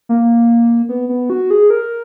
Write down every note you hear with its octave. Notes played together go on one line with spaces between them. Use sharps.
A#3
B3
B3
F#4
G#4
A#4